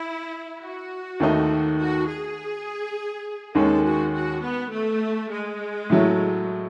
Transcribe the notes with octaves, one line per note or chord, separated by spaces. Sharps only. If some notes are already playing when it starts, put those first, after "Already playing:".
Already playing: E4
F#4
D#2 D#3 A3 D#4
F#4
G#4
D#2 D#3 G#3 C#4 A4
F#4
F#4
B3
A3
G#3
A2 F#3 A3